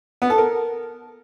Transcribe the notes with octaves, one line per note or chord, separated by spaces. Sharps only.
B3
A4
A#4